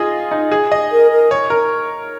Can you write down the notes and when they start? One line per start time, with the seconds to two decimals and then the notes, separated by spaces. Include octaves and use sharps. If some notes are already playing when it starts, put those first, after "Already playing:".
Already playing: F4 G#4 D#5
0.31 D#4
0.52 G#4
0.72 D#5
0.92 A#4
1.11 A#4
1.31 C#5
1.50 A#4